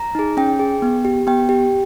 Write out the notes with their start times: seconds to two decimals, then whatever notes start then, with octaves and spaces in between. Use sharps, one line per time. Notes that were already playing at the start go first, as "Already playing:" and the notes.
Already playing: A#5
0.15 D#4 G#4
0.37 C#4 G5
0.59 G#4
0.82 B3
1.05 G4
1.27 B3 G5
1.49 G4